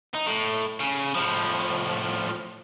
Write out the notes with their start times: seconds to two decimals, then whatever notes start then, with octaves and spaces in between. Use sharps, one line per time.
0.15 D#4
0.27 A2
0.80 C#3
1.15 A2 F3